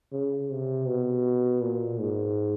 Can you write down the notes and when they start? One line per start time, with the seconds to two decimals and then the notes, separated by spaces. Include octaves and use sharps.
0.12 C#3
0.50 C3
0.87 B2
1.62 A#2
2.00 G#2